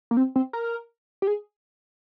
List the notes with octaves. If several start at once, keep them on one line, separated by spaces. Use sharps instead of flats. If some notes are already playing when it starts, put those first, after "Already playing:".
A#3
C4
C4
A#4
G4
G#4